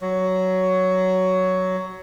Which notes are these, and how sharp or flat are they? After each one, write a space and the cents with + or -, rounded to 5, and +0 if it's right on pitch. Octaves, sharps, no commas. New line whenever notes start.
F#3 +10